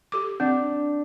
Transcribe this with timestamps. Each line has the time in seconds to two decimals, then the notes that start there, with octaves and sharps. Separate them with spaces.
0.12 G4 A4 D6
0.40 C4 D4